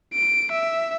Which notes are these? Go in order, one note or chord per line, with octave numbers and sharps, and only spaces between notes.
D7
E5